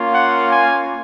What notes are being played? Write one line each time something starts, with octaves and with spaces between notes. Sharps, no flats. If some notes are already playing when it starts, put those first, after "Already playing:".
Already playing: A#3 C#4 F4
F#5
G#5